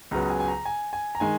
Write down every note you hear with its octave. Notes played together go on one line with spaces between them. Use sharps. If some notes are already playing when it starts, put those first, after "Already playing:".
C#2 C#3 F#3 B3 A#5
G#5
G#5
A#5
G#5
G#5
A#5
D#3 G#3 G#5